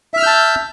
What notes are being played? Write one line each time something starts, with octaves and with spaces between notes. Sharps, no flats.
E5 A5 E6 F6 G6